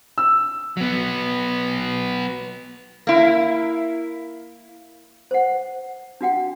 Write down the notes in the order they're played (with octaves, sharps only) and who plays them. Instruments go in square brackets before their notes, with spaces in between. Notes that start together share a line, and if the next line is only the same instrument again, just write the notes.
[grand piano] E6
[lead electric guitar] F#3 B3
[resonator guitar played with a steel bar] A#3 E4
[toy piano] C5 F#5
D4 F#4 F#5 G5